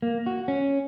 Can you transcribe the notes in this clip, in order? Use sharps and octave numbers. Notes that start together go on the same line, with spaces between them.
A#3
F#4
C#4